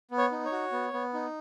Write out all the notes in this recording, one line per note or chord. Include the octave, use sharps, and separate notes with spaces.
B3
C#5
D#4
C#5
F#4
B3
B3
D#4